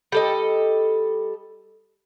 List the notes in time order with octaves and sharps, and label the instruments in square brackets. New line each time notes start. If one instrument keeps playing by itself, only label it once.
[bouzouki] G3 A4 D#5